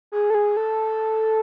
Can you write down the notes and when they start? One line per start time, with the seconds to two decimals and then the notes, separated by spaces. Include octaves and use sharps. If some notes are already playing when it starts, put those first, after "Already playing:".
0.12 G#4
0.30 A4
0.34 G#4
0.57 A4